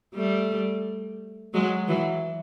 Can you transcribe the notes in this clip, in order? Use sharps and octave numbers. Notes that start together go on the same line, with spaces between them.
G3 A3
F#3 G#3
E3 F#3